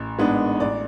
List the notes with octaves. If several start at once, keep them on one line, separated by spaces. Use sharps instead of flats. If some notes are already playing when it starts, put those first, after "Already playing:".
Already playing: A1
G#2 G#3 B3 D4
A1 D5